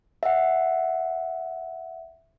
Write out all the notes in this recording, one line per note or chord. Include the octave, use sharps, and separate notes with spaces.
E5 F#5